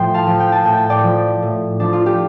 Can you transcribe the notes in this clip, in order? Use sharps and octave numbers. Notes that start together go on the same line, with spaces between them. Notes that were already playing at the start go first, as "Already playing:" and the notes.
Already playing: A2 F3 G5 C6
F5 A5
F3
G5
A5
A2 G5
A5
D5 G5
F3
A2
F3 D4
F4
G4